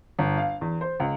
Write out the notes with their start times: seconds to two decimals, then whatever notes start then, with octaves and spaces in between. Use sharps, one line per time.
0.19 G1
0.37 F5
0.61 E2
0.81 C5
1.00 C#2